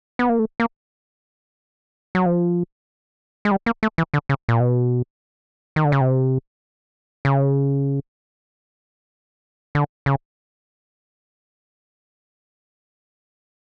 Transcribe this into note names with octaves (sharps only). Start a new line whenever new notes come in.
B3
A#3
A3
A#3
F#3
F3
G#3
G3
A#3
A3
E3
D3
C#3
A#2
B2
D#3
D3
C#3
C3
C#3
D3
C#3